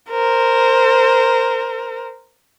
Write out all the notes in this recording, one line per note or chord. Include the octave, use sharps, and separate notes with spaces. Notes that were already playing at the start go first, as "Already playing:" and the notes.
A#4 C5